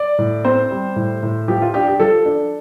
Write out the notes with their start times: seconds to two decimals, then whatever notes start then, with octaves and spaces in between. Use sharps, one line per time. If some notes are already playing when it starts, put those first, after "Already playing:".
Already playing: D5
0.19 A2
0.45 C4 C5
0.71 G3
0.96 A2
1.23 A2
1.48 F3 G4
1.62 F4
1.74 D4 G4
1.88 G4
2.00 F3 A4
2.25 D4